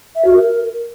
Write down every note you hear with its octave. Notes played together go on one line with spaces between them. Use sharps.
E5
F#4
A#4